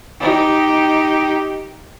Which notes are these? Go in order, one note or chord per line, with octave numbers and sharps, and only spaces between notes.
D#4 G4